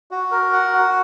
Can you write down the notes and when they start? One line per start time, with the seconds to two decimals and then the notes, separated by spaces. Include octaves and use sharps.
0.11 F#4
0.31 A#4
0.53 F#5
0.73 F#4